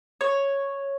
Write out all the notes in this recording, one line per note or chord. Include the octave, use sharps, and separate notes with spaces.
C#5